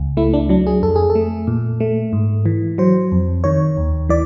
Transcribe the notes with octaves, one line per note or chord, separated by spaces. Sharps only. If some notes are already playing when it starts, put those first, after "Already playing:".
Already playing: C#2
A3 E4
D4
F#3 D4
G#4
F2 A4
G#4
A4
A3
A#2
A3
G#2
E3
F#3 C5
F2
D#3 C#5
D#2
E3 D5